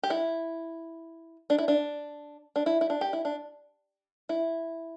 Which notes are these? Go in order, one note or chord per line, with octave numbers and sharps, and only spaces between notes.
G4
E4
D4
E4
D4
D4
E4
E4
D4
G4
E4
D4
E4